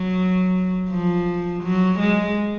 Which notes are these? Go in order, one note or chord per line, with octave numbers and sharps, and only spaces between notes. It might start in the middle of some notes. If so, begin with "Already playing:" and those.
Already playing: F#3
F3
F#3
G#3